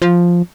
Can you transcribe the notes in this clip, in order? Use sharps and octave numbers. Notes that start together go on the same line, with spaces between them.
F3